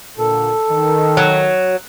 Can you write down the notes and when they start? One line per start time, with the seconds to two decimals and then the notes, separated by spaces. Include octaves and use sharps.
0.18 A#2 D3 A4
0.70 D#3
1.17 F#3